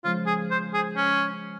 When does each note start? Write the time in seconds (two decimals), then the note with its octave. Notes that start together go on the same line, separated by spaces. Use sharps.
0.03 C#3 F3 G#3 F4
0.26 G#4
0.51 C5
0.74 G#4
0.96 C#4